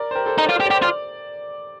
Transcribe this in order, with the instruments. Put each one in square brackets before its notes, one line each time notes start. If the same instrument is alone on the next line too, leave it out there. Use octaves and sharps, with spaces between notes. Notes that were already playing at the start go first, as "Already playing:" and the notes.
Already playing: [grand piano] A#4 D5
C5
G4 A#4
A4 C5
[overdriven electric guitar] D#4 [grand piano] C5
[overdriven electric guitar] F4 [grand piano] D5
[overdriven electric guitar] G4 [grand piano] C5
[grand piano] D5
[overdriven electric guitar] G4
[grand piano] C5
[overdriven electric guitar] F4 [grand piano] D5